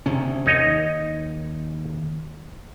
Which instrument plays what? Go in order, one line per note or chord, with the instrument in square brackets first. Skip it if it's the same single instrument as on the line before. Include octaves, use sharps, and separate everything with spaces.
[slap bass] D2 C3 C#4
[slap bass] D#2 [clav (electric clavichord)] D#4 C#5 D#5